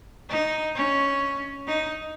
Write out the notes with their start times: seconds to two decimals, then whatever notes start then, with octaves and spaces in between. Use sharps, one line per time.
0.29 D#4
0.75 C#4
1.67 D#4